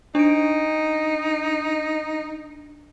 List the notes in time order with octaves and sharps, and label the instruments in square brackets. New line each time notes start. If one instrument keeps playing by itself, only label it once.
[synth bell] D4 D7 [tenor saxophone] D#4